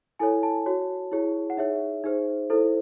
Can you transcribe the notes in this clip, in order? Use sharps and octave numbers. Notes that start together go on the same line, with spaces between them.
E4 A4 C#5 G#5
A5
F#4 C#5
E4 G#4 C#5
F#5
D#4 G#4 C#5 E5
D#4 G#4 C5
E4 A4 C5